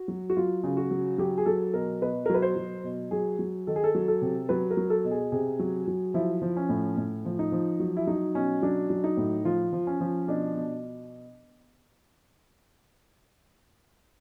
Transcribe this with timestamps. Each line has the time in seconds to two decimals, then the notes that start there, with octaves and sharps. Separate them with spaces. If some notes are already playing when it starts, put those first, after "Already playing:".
Already playing: F#4
0.08 F#3
0.30 F#4
0.36 F#3 F4
0.64 C#3
0.77 F#4
0.91 F#3
1.18 F#3 G4
1.38 G#4
1.46 F#3 A4
1.74 B2 A#4
2.02 B2 B4
2.26 A#4
2.30 F#3 B4
2.42 C5
2.56 F#3
2.83 B2
3.11 F#3 G#4
3.39 F#3
3.67 D#3 A4
3.76 G#4
3.84 A4
3.95 F#3
4.08 A4
4.22 C3
4.49 F#3 B4
4.71 A#4
4.77 F#3
4.90 A4
5.04 B2
5.11 G#4
5.32 C3 G#4
5.59 F#3
5.87 F#3
6.14 F3 E4
6.42 F3
6.57 C#4
6.69 A2
6.97 A2
7.25 F3
7.39 D#4
7.52 F3
7.80 F#3
7.97 E4
8.07 F#3 D#4
8.35 B2 C#4
8.62 F#3 D4
8.90 F#3
9.04 D#4
9.17 A2
9.45 F3 F4
9.73 F3
9.87 C#4
10.00 F3
10.27 B2 D4
10.55 B2